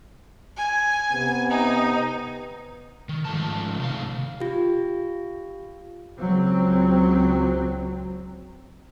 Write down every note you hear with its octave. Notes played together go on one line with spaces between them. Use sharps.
G#5
C3 B3
D#4
D#3
G#2 F3 A3 A5
C3 D#3 A#4 F5
F4 G4
C#2 F#3 C4